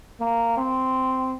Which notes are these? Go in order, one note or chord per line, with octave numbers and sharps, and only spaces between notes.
A#3
C4